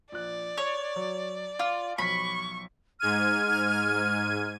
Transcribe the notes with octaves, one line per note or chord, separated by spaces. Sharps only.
A#1 D5 F#6
C#5 F7
F#3
F4 F5 D6 F6
B1 F3 B5 C#6 B6
G#2 F6 G#6 D#7